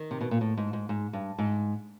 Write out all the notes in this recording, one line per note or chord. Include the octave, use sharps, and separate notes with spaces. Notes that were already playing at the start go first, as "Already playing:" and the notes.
Already playing: D#3
C3
B2
A#2
A2
G#2
G#2
G#2
G2
G#2